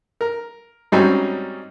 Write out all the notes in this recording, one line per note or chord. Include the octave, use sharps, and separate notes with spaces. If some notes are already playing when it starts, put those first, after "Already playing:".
A#4
G#2 F#3 G3 C4 C#4 D#4